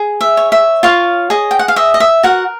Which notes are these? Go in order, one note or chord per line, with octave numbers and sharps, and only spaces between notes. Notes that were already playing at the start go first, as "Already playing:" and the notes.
Already playing: G#4
E5
C#5
E5
F4 C#5 F5
G#4 D#5
G5
F#5
F5
D#5 E5
D#5
E5
F#4 A#4 F#5